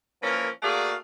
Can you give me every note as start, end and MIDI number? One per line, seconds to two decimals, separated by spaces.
0.23 0.49 52
0.23 0.49 53
0.23 0.49 58
0.23 0.49 61
0.23 0.49 70
0.63 0.95 57
0.63 0.95 58
0.63 0.95 66
0.63 0.95 68
0.63 0.95 74
0.63 0.95 77